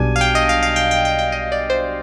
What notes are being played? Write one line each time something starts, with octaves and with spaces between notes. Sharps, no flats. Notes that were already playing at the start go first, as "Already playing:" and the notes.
Already playing: B1 B2 G3 D4 G#5
F5
G5
D#5
F5
F5
G5
G5
G5
G5
D#5
D5
C5